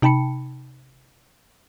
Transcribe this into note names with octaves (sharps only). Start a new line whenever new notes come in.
C3 D#4 G5 A5 B5 C#7